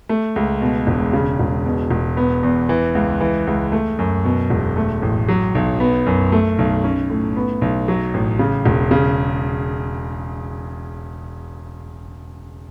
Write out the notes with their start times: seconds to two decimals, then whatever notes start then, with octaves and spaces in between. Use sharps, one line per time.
0.09 A3
0.36 C#2
0.61 B2
0.87 E1
1.13 C#3
1.39 E1
1.66 B2
1.91 E1
2.17 B3
2.43 E2
2.69 E3
2.95 C#2
3.21 E3
3.47 C#2
3.72 A3
3.99 F#2
4.25 B2
4.50 E1
4.76 A3
5.02 A1
5.28 F#3
5.55 B1
5.80 B3
6.06 F#2
6.32 A3
6.59 B1
6.84 C#4
7.10 A2
7.36 B3
7.61 B1
7.88 F#3
8.14 A1
8.39 C#3
8.65 E1
8.91 C#3